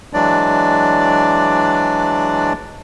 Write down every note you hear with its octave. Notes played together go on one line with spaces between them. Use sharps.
E3 F#3 G#3 D4 D5